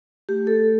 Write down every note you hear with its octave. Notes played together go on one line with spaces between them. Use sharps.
A3 G4
A4